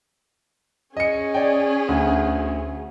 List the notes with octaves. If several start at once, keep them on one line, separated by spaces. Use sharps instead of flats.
C#4 G#4 D#5 C#7
D5 G5
D2